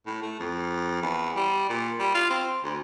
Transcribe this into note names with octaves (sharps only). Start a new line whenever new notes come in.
A2
A3
F2
E2
G3
A#2
G3
F4
C4
D2